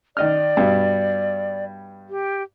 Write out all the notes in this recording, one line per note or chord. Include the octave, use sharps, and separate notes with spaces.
D#3 D5 D#5 F6
G2 B2
G4